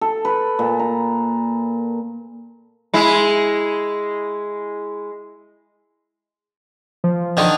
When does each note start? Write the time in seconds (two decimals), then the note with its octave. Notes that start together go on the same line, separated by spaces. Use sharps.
0.01 A4
0.25 B4
0.59 A#2
0.79 A#5
2.94 G#3 E4
7.04 F3
7.37 D3 D#3